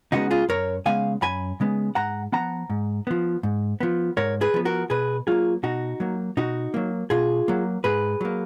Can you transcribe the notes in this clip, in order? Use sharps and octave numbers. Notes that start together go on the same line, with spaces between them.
C#3 G#3 B3 D#4 F#4
F4 G#4
F#2 A#4 C#5
C#3 G#3 B3 F5 G#5
F#2 G#5 B5
C#3 G#3 B3
G#2 F#5 A#5
F3 B3 F#5 A#5
G#2
F3 B3
G#2
F3 B3
G#2 A#4 C#5
G#4 B4
F3 B3
F#4 A#4
B2 G#4 B4
F#3 A#3 F4 G#4
B2 D#4 F#4
F#3 A#3
B2 D#4 F#4
F#3 A#3
B2 F4 G#4
F#3 A#3
G#2 G#4 B4
F#3 A#3